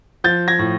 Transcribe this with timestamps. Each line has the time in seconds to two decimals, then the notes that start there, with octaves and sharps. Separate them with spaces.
0.24 F3 G6 A6
0.48 G#6 A#6
0.59 A2